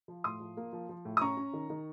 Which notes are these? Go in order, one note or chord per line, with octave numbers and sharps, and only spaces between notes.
F3
A2 C6 D#6
F3
A#3
F3
F3
A2
D#6
C#4 A#5 C#6
C#4
D#3
D#3